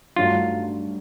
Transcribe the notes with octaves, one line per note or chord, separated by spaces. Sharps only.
G2 D#3 F#3 A3 D4 F4